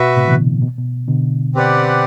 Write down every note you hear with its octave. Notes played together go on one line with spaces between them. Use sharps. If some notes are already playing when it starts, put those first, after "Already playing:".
Already playing: B2 F#4 B4 E5
A2 C3
E3
B2 D3
B2
B2
B2 D3
C4 G4 B4 D5 F#5